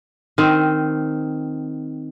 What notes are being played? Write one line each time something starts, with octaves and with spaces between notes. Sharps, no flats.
D#3 C4